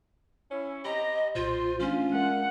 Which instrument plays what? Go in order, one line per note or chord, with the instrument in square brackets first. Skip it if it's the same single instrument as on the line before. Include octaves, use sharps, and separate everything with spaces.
[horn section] C#4 E4
[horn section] C4 G4 A#5 [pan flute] D#5 [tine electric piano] B5
[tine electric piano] B1 A#2 [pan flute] F4 [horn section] C5
[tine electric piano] E3 A3 D4 [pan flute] C#4 [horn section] F4
[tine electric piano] G#3 A#4 [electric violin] F#5